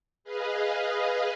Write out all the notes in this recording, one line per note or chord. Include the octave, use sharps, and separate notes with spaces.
G#4 B4 D#5 F5